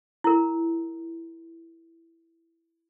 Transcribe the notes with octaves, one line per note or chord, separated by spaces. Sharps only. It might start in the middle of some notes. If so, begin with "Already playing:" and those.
E4 A#4